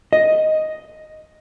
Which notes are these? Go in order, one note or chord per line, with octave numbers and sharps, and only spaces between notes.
D#5